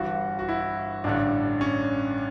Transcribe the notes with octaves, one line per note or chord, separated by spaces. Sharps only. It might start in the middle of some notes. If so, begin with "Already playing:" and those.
Already playing: G1 G2 E3 F#4
F#4
E4
A1 G2 D3 D4
C#4